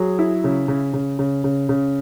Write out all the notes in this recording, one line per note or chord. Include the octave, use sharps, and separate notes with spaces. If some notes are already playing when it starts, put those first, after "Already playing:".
Already playing: F#3 G#4
E4
C#3
C#3
C#3
C#3
C#3
C#3